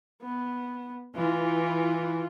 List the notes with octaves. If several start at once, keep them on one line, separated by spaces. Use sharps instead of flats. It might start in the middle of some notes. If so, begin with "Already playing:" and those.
B3
E3 F4